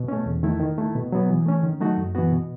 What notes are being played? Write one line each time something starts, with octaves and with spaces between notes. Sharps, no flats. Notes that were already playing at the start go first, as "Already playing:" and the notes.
Already playing: B2
A3 C#4
E2
D#3 A3 E4
D#3
A3 E4
B2
F#3 B3
E3
A3 C#4
D#3
F#3 A3 D#4 F#4
F#2
E3 B3 F#4
B2